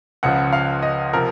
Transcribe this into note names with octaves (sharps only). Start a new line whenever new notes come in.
C#2 C#3 F3 F#5
F5
D#5
C3 F3 A#4